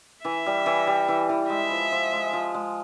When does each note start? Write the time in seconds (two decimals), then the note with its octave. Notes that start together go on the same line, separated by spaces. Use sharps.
0.24 E3 E5
0.46 G3
0.66 E3
0.87 G3
1.08 E3
1.29 E3
1.49 G#3 E5
1.71 F3
1.92 F3
2.13 G#3
2.33 F3
2.54 G#3